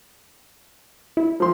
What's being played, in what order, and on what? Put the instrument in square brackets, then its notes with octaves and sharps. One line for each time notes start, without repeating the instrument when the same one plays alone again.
[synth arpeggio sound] E4
[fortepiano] F3 C6